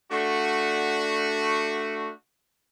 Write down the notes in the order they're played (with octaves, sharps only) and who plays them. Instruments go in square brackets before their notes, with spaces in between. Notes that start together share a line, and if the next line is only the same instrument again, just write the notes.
[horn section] A3 D4 F#4